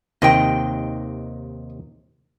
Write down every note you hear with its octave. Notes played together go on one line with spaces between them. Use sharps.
D#2 C3 D#3 D#5 G5